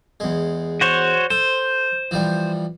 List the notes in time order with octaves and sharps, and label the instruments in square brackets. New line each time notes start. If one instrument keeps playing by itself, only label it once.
[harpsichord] E2 G#3
[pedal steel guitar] F#4 C5 C#5
[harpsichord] A4 [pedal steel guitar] C5
[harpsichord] E3 F3 G3